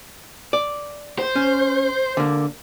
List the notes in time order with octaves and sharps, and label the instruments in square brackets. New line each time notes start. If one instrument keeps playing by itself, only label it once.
[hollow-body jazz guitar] D5
[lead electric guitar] C5
[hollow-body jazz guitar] C#4
D3 A#3